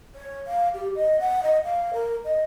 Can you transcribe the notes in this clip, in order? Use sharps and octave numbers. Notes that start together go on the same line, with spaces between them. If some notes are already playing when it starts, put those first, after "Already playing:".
C#5
F5
G4
D#5
F#5
D#5
F5
A#4
D#5